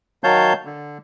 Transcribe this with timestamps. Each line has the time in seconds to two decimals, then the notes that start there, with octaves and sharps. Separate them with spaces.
0.24 D#3 F#3 C#5 F5 A5 G6
0.65 D3